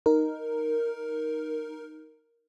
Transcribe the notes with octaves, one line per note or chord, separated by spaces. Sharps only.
D#4 A#4